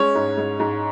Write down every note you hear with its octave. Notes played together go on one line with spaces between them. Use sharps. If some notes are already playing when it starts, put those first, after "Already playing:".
Already playing: G#3 C#4 C#5
G#2
G#2
G#2